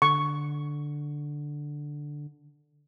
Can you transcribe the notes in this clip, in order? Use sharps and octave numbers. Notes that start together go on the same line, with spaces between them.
D3 C#6